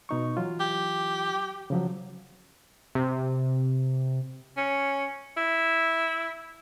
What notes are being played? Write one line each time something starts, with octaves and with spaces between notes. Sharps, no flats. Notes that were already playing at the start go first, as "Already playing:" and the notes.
B2 D#4 C#6
E3 F#3 F4
G4
C#3 F3 F#3
C3
C#4
E4